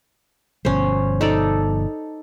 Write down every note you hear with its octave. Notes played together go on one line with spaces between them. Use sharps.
G1 B2 F3 C#4 C5
D#4 A4 D5